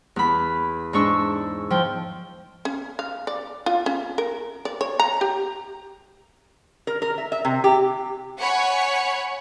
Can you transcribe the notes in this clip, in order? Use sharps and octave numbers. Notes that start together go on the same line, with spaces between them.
E2 B5
G#2 D4 C#6 E6
F3 G5
C#4
F5
D5
F4
C#4
A#4
D5
C#5
A#5
G4
A#4
A#4
E5
E5
C3
G4
C#5 F#5 G#5 B5 C#6